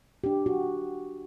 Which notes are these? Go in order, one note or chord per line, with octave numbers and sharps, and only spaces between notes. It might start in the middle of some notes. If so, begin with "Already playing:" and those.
D4 G4
F#4